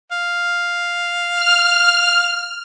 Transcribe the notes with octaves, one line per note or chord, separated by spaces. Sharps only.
F5
F6